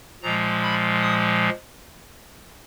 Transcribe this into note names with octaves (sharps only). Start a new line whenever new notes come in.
A#2 F3 G#3 A#5
B5
D#6